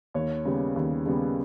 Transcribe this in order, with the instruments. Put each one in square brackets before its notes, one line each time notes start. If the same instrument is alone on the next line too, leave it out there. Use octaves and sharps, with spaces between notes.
[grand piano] D#2 C#5
C#3 G3 B3
D#2
C#3 G3 B3